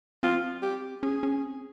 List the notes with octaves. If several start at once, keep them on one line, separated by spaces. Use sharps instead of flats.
C4 F4
G4
C#4 G#4
C#4
C4